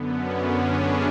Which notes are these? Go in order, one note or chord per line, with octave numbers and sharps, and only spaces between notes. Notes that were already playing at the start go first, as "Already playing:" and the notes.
Already playing: F#2 D3 B3
C#4
D4
G#4